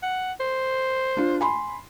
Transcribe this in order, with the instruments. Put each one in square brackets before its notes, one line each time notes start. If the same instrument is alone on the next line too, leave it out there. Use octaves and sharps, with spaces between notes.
[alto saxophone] F#5
C5
[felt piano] D4 F4
G#5 B5 C6